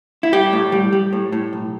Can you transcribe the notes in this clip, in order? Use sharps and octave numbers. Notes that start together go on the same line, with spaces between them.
E4
G3 G4
A2
G3
G3
A2
A2
B1